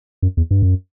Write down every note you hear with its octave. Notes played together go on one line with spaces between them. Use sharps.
F#2
E2
G2
F#2